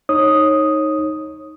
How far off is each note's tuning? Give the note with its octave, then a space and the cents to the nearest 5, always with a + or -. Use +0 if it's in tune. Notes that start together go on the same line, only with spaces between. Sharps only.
D#4 +0 C#5 -25 D#6 +0